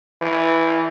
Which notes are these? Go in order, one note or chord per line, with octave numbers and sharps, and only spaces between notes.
E3